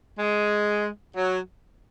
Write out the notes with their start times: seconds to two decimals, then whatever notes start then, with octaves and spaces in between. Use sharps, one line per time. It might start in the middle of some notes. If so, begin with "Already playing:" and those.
0.19 G#3
1.16 F#3